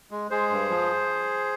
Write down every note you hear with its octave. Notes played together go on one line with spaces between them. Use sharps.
G#3
G#3 G#4 C5
G2
F3